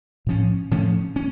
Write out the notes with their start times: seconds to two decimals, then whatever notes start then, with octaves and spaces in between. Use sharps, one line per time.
0.27 A2 F3 C#4
0.71 A2 F3 C#4
1.16 C#4